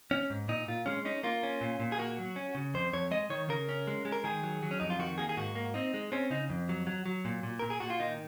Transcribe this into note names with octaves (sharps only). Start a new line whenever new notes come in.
C#4
G#2
A#2 D#4
A#2 F4
G#3 C#4
C#4 D#4
A#3 F4
C#4
A#2
A#2
G#4
A#3 F#4
F#3
C#4
C#3
F2 C5
F2 C#5
G#3 D#5
D#3 C#5
C#3 A#4
C#4
G#3
G#3
A#4
D#3 G#4
F#3
F#3
C#4
F2 D#4
F4
D#3 F#4
A#3 G#4
G#4
G#2 F#4
A#3
C4 D#4
G#3
C4 C#4
C#3 D#4
F2
F#3
F#3
F#3
A#2
A#2
A#2 A#4
G#4
A#2 F#4
F4
D#3 D#4